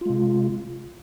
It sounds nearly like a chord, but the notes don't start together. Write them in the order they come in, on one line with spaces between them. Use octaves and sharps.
F4 G#3 C3